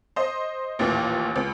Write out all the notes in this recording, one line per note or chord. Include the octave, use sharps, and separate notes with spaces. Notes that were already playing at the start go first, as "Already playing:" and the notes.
C5 D#5
A1 D#2 A#2 E3
C#2